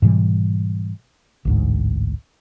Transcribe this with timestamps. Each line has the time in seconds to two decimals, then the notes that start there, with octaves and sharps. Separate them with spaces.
0.02 G#2 B2 E3 G3
1.45 A1 D2 G#2